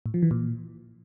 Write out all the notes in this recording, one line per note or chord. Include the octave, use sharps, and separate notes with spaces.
A2
F3
E3
A#2